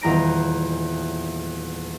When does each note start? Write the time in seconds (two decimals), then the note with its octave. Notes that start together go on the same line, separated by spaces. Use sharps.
0.01 D#1 E2 A#5 A#6 D7